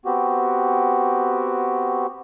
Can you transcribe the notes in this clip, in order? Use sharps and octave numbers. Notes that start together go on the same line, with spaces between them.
B3 C4 F#4 G4